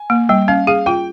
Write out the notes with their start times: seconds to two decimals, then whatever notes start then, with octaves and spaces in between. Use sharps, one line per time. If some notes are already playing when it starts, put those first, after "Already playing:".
Already playing: G#5
0.10 A#3
0.29 G3 G5
0.48 C#4 F5
0.67 G#4 F5
0.86 F4 G5